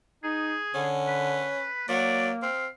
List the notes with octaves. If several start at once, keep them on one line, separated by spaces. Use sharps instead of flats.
D#4 G#4
D3 C#4
B4
F#3 A#3 D5
C4 F5